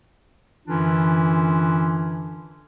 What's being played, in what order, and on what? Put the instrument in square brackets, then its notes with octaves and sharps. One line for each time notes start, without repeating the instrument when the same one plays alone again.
[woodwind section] F#2 D3 E3 C#4 D4 F4